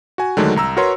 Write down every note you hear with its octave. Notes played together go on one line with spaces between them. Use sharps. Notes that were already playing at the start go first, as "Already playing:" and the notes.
F#4 G#5
D3 D#3 F#3 G#3 A3 D4
C2 A#5 E6
F#4 A#4 B4 C#5 A#5 C6